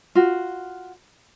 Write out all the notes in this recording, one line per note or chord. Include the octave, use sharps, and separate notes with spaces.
F4 F#4